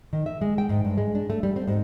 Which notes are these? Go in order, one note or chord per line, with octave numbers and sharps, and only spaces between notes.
D#3
E5
G#3
G5
G#2
G2
G#3
D4
A3
G3
C4
G#2